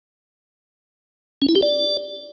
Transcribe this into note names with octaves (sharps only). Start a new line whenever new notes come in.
C#4
E4
G4
D5